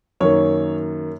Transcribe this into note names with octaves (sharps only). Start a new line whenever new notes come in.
F#2 D#3 A#3 C#5